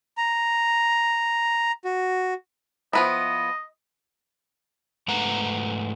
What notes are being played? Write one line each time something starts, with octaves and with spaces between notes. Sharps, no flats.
A#5
F#4
F3 B3 E4 D#5
G#2 A3 B4 F#5 A#5